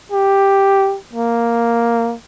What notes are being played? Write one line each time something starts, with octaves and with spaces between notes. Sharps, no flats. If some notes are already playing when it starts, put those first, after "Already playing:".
G4
A#3